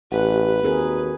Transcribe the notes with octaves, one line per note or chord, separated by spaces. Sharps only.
A1 G4 B4 F#5
D#2 C4 F#4 G#4 A#4